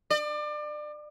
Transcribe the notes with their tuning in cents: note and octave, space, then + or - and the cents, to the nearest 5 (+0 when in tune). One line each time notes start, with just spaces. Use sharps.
D5 +30